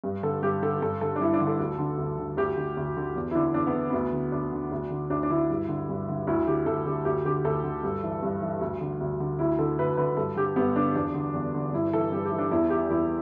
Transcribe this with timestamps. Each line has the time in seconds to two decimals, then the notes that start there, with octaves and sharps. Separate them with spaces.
0.04 G2
0.23 D3 A4
0.42 G2 G4
0.62 D3 A4
0.81 G2 A4
1.01 D3 A4
1.16 D4
1.20 G2 E4
1.34 D4
1.41 D3
1.47 A4
1.60 D2
1.79 D3
1.98 D2
2.19 D3
2.37 D2 G4
2.57 D3
2.77 D2
2.97 D3
3.16 E2
3.31 E4
3.35 D3 D4
3.54 E2 D4
3.67 B3
3.74 D3
3.90 D2 B3
4.13 D3
4.32 D2 D4
4.53 D3
4.72 D2
4.91 D3
5.10 D2 D4
5.23 D4
5.30 D3 E4
5.50 G2
5.68 D3
5.89 G2
6.09 D3
6.27 D2 E4
6.47 D3 G4
6.66 D2 A4
6.86 D3 G4
7.05 D2 G4
7.25 D3 G4
7.44 D2 A4
7.64 D3
7.83 G2
8.03 E3
8.23 G2
8.42 E3
8.61 D2
8.81 D3
9.01 D2
9.20 D3
9.39 D2 E4
9.59 D3 A4
9.79 D2 B4
9.97 D3 B4
10.17 G2 A4
10.36 D3 G4
10.56 G2 B3
10.76 D3 D4
10.96 E2 D4
11.14 D3
11.34 E2
11.54 D3
11.73 G2 E4
11.93 E3 A4
12.12 G2 G4
12.25 G4
12.31 E3
12.39 D4
12.51 E2 E4
12.70 E3 G4
12.90 E2 E4